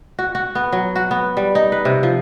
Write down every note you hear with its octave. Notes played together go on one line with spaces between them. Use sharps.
F#4
F#4
B3
F#3
F#4
B3
G3
D#4
B4
C3
F3